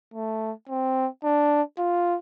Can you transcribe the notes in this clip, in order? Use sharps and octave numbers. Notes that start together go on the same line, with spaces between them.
A3
C4
D4
F4